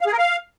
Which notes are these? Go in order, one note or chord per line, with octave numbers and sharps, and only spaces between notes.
F5
G#4
A#4
F5